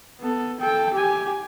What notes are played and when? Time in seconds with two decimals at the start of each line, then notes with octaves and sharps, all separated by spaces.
0.20 B3 A4
0.60 A4 G5
0.94 G4 G#5